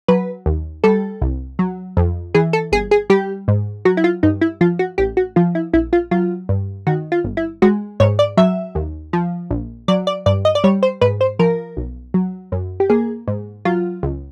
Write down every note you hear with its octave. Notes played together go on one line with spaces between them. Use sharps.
F#3 B4
D#2
G3 A4
C2
F#3
F2
E3 G#4
A4
G1 G#4
G#4
G3 G4
G#2
F#3 F#4
E4
F4
G2 D#4
E4
F3 F4
F#4
A1 G4
F#4
F3 F4
E4
A#1 E4
F4
F#3 F4
G2
D#3 F#4
F4
G1
E4
G#3 F#4
G#2 C#5
D5
F#3 E5
D#2
F3
A#1
F#3 D5
D5
G2 D5
D#5
D5
G3 C#5
C5
G#2 B4
C5
F3 A#4
B1
F#3
F#2
G4
A#3 G#4
G#2
F#3 F4
C#2